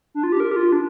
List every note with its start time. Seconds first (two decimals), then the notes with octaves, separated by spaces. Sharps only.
0.15 D4
0.23 F4
0.32 G4
0.40 A#4
0.51 G4
0.56 F4
0.72 D4